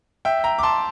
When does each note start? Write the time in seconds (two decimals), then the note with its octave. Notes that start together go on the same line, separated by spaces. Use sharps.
0.25 E5 G5
0.44 G5 A#5
0.59 D6
0.63 A5 C6